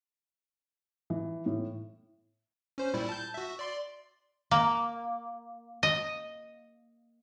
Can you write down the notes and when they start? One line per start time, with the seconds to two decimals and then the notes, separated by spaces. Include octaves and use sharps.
1.10 E3
1.46 A2
2.78 C#4 C5
2.94 A#2 G3 E4
3.09 A5 G6
3.34 F#4 E5
3.59 D5 C6
4.51 A#3
5.83 D#5